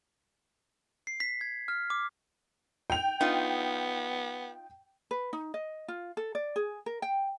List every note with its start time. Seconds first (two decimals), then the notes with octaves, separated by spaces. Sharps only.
1.07 C7
1.20 B6
1.41 G#6
1.68 F6
1.90 D6
2.90 G5 F7
3.21 B3 D#4 F4
5.11 B4
5.33 D#4
5.54 D#5
5.88 F4
6.17 A4
6.35 D5
6.56 G#4
6.86 A#4
7.02 G5